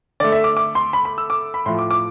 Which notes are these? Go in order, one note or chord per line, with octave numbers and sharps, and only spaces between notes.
D3 A3 D5
E5
D6
D6
C6
B5
B5
E6
D6
B5
A2 F3 A3 C6
D6
D6